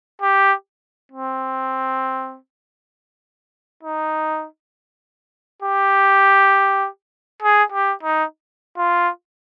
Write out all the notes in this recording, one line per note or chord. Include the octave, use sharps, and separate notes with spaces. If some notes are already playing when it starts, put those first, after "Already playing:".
G4
C4
D#4
G4
G#4
G4
D#4
F4